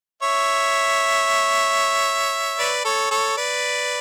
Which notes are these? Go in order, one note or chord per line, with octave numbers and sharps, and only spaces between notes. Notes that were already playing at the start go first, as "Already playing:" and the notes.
C#5 E5
B4 D5
A4 C#5
A4 C#5
B4 D5